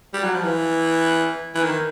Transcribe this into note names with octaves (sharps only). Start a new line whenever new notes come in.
G3
F#3
F3
E3
E3
D#3